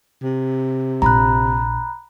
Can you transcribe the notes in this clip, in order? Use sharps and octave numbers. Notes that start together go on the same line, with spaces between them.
C3
A#1 F4 A#5 B5 F#6